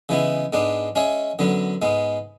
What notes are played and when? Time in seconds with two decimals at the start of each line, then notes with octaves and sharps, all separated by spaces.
0.09 C#3 E3 G#3 B3 E4
0.53 G#2 G#3 B3 D4
0.96 G#3 C#4 G#4 C#5 E5
1.39 F#2 D3 F#3 B3
1.82 G#2 G#3 B3